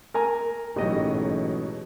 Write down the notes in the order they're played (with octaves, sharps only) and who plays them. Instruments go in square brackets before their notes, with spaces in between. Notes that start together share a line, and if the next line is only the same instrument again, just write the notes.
[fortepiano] A#4 G#5 A#5
[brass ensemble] A1 G#2 [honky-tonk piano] B2 F#3 [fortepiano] G4 D#5